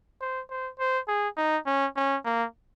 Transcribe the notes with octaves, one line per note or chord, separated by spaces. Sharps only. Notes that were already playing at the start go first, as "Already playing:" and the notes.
C5
C5
C5
G#4
D#4
C#4
C#4
A#3